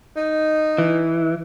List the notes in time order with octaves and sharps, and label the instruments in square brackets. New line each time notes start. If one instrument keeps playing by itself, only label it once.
[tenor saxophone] D#4
[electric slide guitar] E3